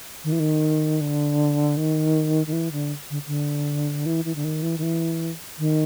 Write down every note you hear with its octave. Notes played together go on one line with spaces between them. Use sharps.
D#3
E3
D#3
D3
D#3
D#3
E3
D3
D3
D3
E3
E3
D3
D#3
E3
D#3
E3
D#3